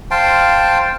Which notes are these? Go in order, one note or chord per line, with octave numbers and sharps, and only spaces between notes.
C5 F5 G5 A5